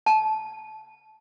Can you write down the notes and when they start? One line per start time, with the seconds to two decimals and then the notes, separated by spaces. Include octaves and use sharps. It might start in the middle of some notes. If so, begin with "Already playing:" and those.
0.06 A5